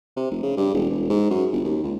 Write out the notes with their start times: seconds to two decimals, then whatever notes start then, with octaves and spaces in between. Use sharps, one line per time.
0.17 C3
0.31 F1
0.43 C#3
0.57 G2
0.74 E1
0.90 E1
1.10 G#2
1.30 F#2
1.52 G1
1.65 D#2
1.84 C#2